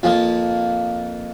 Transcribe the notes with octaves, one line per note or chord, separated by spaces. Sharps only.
F2 F3 A#3